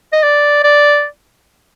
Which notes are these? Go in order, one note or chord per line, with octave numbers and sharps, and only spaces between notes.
D#5
D5
D5